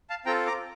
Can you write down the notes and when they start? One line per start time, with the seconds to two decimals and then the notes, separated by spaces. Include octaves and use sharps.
0.10 F5 A5
0.26 C4 F4 A4 G5 A#5
0.47 A#5 D6